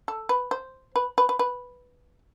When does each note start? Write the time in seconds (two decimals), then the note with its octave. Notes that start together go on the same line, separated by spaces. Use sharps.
0.08 A4
0.29 B4
0.51 C5
0.96 B4
1.18 B4
1.29 B4
1.39 B4